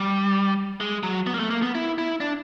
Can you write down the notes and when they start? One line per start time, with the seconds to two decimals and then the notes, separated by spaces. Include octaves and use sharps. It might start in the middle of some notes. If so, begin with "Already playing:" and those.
Already playing: G3
0.80 G#3
1.03 F#3
1.27 B3
1.34 A#3
1.39 A3
1.50 A#3
1.63 B3
1.75 E4
1.98 E4
2.21 D4